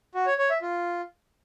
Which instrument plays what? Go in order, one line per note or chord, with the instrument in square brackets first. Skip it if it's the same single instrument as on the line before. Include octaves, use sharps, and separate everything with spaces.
[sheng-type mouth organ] F#4
C#5
C#5
E5
F4